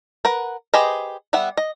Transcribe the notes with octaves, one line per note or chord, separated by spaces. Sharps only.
A#4 B4 F#5
G4 G#4 B4 C5 D#5
G3 B3 E5 F#5
D#5